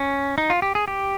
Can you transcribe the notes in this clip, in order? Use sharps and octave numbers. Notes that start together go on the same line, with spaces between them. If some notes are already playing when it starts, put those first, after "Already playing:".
Already playing: C#4
D#4
F4
G4
G#4
G4